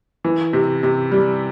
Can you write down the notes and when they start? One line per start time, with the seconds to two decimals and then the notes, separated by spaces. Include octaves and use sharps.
0.24 E3
0.53 C3
0.83 C3
1.12 G3